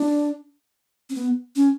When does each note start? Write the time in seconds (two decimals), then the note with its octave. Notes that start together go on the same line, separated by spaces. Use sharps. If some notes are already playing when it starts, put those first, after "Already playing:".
Already playing: D4
1.10 C4
1.15 B3
1.56 C#4